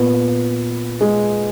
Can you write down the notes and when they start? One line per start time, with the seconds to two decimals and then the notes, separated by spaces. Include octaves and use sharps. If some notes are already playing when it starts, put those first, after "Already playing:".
Already playing: A#2 B3
1.01 G#3